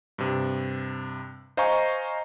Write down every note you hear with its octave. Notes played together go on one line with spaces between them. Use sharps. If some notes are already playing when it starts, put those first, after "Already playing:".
G2 C3
C5 D#5 F5 G#5 A#5 C#6